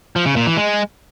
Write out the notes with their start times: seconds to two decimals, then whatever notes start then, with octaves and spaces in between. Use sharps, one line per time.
0.16 F3
0.26 C#3
0.36 A#2
0.46 E3
0.57 G#3